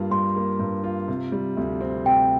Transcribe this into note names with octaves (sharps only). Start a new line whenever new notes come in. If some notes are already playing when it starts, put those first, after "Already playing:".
Already playing: G2 G3 A#3 F4
G3 C6
A#3
G2
F4
C3
G3
D2
C4
C3 G5